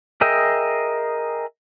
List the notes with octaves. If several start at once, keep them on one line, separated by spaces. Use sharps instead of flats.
G#4 A#4 D#5 E5 G5